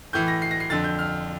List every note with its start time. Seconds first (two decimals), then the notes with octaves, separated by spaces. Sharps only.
0.13 A2 E3 G6
0.28 A#6
0.42 C7
0.51 A#6
0.60 C7
0.70 F2 D3 A6
0.84 G6
0.99 F6